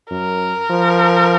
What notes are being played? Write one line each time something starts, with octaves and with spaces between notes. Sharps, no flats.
F#2 A#4
F3